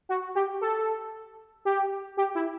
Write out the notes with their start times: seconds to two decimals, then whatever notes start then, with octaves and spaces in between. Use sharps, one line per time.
0.09 F#4
0.35 G4
0.61 A4
1.65 G4
2.17 G4
2.35 E4